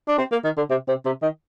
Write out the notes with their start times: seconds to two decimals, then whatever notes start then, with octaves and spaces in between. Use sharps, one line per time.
0.08 D4
0.18 C4
0.32 A#3
0.44 D#3
0.57 D3
0.70 C3
0.88 C3
1.05 C3
1.22 D#3